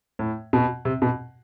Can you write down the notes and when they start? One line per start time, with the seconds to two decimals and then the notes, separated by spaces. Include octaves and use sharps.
0.19 A2
0.53 B2
0.85 C3
1.02 B2